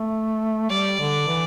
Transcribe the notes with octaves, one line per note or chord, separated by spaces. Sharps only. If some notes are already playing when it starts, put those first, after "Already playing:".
Already playing: A3
G3 D5
D3
E3